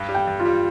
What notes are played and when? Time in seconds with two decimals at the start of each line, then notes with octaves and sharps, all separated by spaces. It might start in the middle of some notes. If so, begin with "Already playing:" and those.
Already playing: G2
0.09 G3
0.14 G5
0.27 G2
0.40 F4
0.46 G3